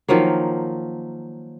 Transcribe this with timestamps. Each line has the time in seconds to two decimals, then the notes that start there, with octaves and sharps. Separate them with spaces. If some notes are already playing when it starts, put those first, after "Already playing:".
0.08 D#3 F3 F#3 A#3